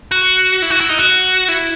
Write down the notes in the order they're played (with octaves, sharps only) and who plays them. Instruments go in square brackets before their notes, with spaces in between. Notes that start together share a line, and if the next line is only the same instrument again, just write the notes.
[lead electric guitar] F#4
E4
F#4
E4
D#4
F#4
E4